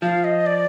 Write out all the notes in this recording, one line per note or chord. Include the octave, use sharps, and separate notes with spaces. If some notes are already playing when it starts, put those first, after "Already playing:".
F3 F5
D#5
D5